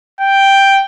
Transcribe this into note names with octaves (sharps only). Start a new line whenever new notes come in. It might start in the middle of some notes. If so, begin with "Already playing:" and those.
G5